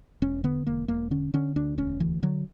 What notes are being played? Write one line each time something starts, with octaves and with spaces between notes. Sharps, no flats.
E1 C#4
D3 B3
E1 A#3
E1 A#3
D3 C#4
D3 C#4
D2 D4
E1 C#4
D2 E3
D3 F#3